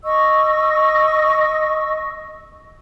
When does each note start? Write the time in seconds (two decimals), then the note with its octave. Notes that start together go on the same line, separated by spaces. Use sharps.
0.04 D#5 C#6 E6